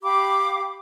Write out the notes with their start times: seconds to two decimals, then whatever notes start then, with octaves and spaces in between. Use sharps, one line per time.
0.03 G4 F5 B5 D6